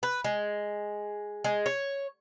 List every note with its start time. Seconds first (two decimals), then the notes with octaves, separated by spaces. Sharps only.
0.03 B4
0.24 G#3
1.44 G#3
1.66 C#5